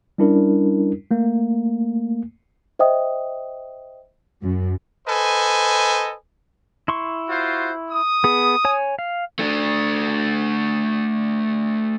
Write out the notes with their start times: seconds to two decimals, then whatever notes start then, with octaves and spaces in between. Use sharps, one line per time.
0.18 G3 C#4 D4 E4 A#4
1.11 A3 A#3
2.79 C5 D#5 E5 G5 D#6
4.42 F#2
5.08 A4 B4 C5 D#5 G#5
6.88 E4 C6 C#6
7.29 F4 F#4 C5
7.91 D#6
8.24 B3 G#4
8.65 C#5 G#5
8.99 F5
9.39 A3 D4